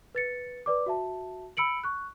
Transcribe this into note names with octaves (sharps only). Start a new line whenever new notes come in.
B4 A6 C#7
B4 D5 D6
F#4 E5 A5
B5 E6 C#7 D7 F#7
C#6 F#6